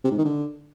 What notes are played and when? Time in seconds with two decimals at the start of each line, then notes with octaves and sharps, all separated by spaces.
0.04 C3
0.11 G#2
0.18 D#3
0.25 D3